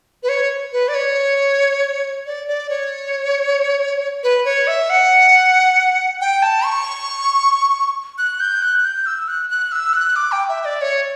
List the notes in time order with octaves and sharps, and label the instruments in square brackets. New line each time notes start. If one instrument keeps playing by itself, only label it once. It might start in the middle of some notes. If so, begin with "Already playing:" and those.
[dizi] B4
C#5
B4
D5
C#5
D5
D5
C#5
B4
C#5
E5
F#5
G5
A5
C#6
F#6
G6
F#6
G6
E6
F#6
F#6
E6
F#6
D6
G5
E5
D5
C#5